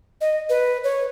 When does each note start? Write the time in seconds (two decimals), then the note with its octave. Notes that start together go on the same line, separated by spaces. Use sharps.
0.21 D#5
0.50 B4
0.84 C#5